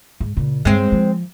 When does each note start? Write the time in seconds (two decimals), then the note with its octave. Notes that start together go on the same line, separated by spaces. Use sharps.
0.20 G#2
0.37 A#2 C#3
0.65 G2 G#3 C4
0.92 F3